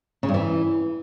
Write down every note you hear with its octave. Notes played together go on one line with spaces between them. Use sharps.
C#3
G2
E3